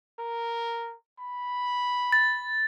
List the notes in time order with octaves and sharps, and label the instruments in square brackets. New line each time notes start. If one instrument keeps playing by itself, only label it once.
[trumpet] A#4
B5
[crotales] A6